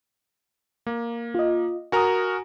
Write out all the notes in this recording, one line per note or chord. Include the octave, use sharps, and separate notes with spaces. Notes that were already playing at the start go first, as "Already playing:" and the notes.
A#3
F4 D#5
F#4 A#4 G#5 A#5 D#6